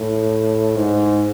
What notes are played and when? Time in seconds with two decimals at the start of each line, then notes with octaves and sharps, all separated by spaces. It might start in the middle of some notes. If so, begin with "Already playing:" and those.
Already playing: A2
0.76 G#2